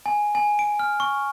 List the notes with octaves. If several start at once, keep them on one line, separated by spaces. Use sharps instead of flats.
G#5
G#5
D7
F6
C#6